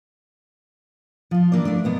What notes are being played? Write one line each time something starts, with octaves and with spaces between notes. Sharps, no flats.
F3 F4
E3 A#3 D4 D5
A3 D4
B2 B3 A#4